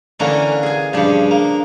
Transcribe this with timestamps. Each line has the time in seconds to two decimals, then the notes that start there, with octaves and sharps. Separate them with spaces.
0.20 D3 E3 A#3 C#4 D4 A#4
0.63 G#4 G#5
0.93 G2 C#3 F3 D4
1.31 A#3